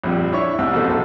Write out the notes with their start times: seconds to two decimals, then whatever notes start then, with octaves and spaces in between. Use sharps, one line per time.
0.04 A#1 F2 G3
0.32 D4 E4 C#5 E5 C#6
0.58 C2 G#2 E6
0.73 A1 B2 C4 A4
0.87 A#1 A4